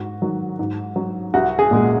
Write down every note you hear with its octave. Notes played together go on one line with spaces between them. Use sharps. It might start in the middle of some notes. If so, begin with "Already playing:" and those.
Already playing: G#2 F#4
D#3 F#3
G#2
F#3
C2 F#4
G#4
A#2 G#3